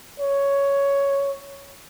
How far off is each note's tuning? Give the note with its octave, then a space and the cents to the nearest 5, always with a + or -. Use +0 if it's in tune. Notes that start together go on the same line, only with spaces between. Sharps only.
C#5 +5